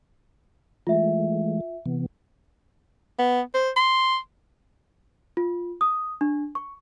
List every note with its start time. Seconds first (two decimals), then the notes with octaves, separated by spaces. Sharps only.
0.87 E3 G#3 A3 F4 E5
1.86 C3 E3 B3
3.19 B3
3.54 C5
3.76 C6
5.37 F4
5.81 D#6
6.21 D4
6.55 C#6